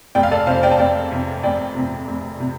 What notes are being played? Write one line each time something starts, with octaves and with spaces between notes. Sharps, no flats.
F1 D5 G5
F5
A4 D5
F2 C3 C5 F5
D5 G5
A5
F1 D5 G5
F2 C3
F1 D5 G5
F2 C3
F1
C3